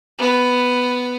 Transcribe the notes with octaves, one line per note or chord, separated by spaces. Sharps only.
B3 B4